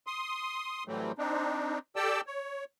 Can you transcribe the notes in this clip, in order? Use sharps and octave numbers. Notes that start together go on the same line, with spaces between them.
C6 D#6
A2 E3 F#3 G3 A3 C4
C4 D4 D#4
G4 A4 D5 G5 A5 E6
C#5